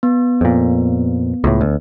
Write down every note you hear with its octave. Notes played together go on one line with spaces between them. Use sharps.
B3
F2 A#2
C#2 A2
D2